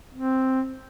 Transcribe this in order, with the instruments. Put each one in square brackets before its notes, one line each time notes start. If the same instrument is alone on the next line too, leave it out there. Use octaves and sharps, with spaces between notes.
[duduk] C4